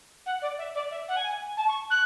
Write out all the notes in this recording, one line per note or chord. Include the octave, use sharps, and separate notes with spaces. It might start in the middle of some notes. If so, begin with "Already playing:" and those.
F#5
D5
E5
D5
E5
F#5
G#5
A5
C#6
F#6